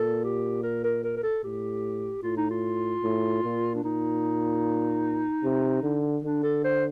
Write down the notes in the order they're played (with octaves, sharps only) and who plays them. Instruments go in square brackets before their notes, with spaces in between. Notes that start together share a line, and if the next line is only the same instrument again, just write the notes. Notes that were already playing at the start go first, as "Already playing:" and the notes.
Already playing: [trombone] A#2 [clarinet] A4
[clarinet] G4
A#4
A#4
A#4
A#4
A4
[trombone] A2 [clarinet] G4
[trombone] A2 [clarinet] F4
[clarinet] D#4
F4
[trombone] A2
A#2
[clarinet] D4
[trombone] A#2 [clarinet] D#4
[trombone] C3
D3
[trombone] D3 [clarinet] D4
[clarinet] A4
C5